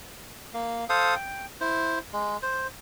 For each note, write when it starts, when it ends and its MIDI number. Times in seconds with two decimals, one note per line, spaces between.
0.54 0.85 58
0.89 1.15 69
0.89 1.15 72
0.89 1.15 77
0.89 1.15 87
1.16 1.46 79
1.61 1.99 64
1.61 1.99 72
2.13 2.37 56
2.42 2.67 72